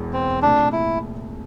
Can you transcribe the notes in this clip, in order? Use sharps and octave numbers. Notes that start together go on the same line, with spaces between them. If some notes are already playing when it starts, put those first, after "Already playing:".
Already playing: E1 E2 E3
C4
C2 A#2 A3 D4
E4